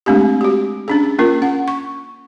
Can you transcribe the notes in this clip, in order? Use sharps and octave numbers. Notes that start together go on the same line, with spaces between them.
G#3 A3 C4 D4 G4
F#4 G4
C#4 D4 G#4
A#3 C#4 F4 A#4
C#4 F#5
C#6